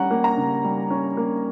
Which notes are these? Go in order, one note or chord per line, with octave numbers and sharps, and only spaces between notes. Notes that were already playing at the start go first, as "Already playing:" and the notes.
Already playing: G3 C#4 F#5 A#5
A#3
A#5
C#3
G3
C#4
A#3